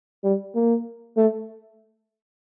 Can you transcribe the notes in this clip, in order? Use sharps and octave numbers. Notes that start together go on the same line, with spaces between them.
G3
A#3
A3